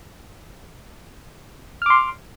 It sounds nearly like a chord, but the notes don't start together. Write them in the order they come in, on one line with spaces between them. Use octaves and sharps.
F6 D6 C6